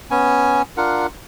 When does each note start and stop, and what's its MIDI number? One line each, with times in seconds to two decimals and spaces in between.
0.11 0.62 59
0.11 0.62 61
0.11 0.62 80
0.77 1.07 62
0.77 1.07 65
0.77 1.07 70
0.77 1.07 78